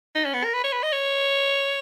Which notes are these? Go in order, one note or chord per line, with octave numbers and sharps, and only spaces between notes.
D#4
C#4
B3
A#4
B4
C#5
B4
D#5
C#5